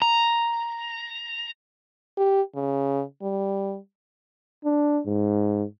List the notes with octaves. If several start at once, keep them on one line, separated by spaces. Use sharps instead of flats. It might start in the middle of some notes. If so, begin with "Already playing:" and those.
A#5
G4
C#3
G3
D4
G#2